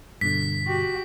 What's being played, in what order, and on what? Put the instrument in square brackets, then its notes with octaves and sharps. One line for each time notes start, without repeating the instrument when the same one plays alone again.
[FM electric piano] G2 B2 D3 [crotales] B6
[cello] F#4 G4